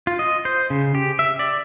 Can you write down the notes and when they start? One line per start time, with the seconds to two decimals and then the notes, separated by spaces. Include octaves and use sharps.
0.07 F4
0.19 D#5
0.45 C5
0.70 C#3
0.95 G4
1.19 E5
1.39 D5